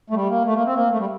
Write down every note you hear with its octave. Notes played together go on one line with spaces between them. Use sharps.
A3
G3
A#3
A3
A#3
C4
A#3
A3
G3